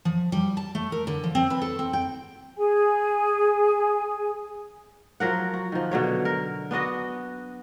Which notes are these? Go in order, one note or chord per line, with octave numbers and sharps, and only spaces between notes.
F3
G3
A5
A3
A#4
D3
F3
C4
B4
A4
C4
G5
G#4 G#5
F3 F#3 A#4 F#5
F#4
D#3 F3
B2 D3 F#3 C#5
A#4
B3 D4 F#4 D#5